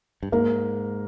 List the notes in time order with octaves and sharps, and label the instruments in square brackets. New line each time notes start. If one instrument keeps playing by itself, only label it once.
[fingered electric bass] G2
[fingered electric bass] G#2 [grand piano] A#3